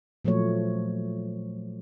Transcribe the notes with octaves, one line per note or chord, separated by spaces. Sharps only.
A#2 F3 F#3 A3 C#5